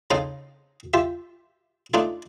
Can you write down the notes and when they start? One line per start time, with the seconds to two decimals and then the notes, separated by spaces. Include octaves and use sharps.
0.11 C#3 C4 D#4 A4 D#5 F5
0.94 F4 G4 E5
1.94 A3 D4 D#4 F4 A4